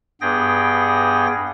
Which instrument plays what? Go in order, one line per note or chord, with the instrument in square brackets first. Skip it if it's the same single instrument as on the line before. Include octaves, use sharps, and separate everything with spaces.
[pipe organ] G2 B3 G#4 G5 A#6